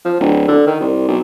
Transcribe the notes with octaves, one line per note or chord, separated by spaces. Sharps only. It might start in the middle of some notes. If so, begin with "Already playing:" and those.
F3
D1
D3
D#3
C2
B1